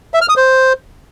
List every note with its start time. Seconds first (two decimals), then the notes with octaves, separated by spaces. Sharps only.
0.14 E5
0.21 F6
0.29 D#6
0.37 C5